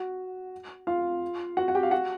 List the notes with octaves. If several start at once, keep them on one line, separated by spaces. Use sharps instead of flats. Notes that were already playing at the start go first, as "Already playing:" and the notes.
Already playing: F#4 F#5
F4 F5
F#4 F#5
F#5
G4 G5
F5
F#4 F#5